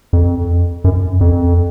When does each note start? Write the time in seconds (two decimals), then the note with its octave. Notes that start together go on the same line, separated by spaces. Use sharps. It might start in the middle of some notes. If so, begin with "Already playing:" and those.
0.13 F2
0.84 F#2
1.21 F2